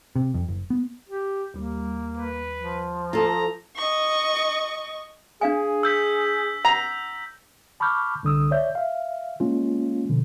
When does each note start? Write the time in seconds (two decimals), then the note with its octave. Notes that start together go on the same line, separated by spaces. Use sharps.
0.16 C3
0.34 F2
0.49 F#1
0.70 B3
1.09 G4
1.54 D#2 G3 A#3
2.17 B4
2.57 F3
3.13 F4 A4 A#5
3.77 D#5 C#6
5.41 D4 G#4 F5 G#5
5.83 E6 G6 B6
6.65 F#5 A#5
7.80 A5 B5 C#6 D6 F6 G6
8.23 C2 D3 D#6 E6
8.51 C#5 D5 E5 G6
8.75 E5 F5
9.40 G#3 A#3 C#4 F4
10.09 B2 D3 F3